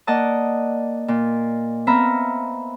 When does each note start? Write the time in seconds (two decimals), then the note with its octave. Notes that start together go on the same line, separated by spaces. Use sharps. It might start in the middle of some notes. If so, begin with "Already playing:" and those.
0.07 A#3 D5 D#5 F#5 A5 D#6
1.08 A#2
1.87 B3 C4 E5 F5 A#5 B5